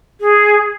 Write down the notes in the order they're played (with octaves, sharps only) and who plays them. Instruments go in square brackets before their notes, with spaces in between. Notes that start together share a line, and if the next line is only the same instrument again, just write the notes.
[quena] G#4